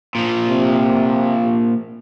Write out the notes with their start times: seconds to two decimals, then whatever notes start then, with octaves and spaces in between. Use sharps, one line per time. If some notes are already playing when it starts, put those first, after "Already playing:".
0.15 A#2 F3
0.48 C3